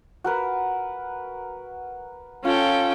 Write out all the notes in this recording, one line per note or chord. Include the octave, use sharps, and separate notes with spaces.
F#4 A#4 B4
C#4 F4 A4 G5